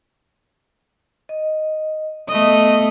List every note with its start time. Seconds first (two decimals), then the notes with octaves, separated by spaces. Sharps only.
1.29 D#5
2.29 A3 B3 D#5 D#6